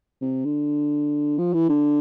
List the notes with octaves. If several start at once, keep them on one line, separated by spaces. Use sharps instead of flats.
C3
D3
F3
E3
D3